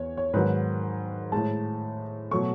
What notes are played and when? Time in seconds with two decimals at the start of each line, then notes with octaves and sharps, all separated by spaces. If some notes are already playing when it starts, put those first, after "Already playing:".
Already playing: E2 C#5
0.17 C#5
0.34 G#2 D#3 F#3 B4
1.32 A2 G#3 A5
2.31 B2 F#3 A3 C#6